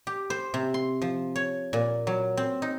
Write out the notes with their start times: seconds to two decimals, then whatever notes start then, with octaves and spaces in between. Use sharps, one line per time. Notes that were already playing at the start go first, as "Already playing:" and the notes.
0.07 G4
0.30 C5
0.54 C3
0.74 C6
1.02 F3
1.36 C#5
1.73 A#2
2.07 F#3
2.37 C4
2.62 D#4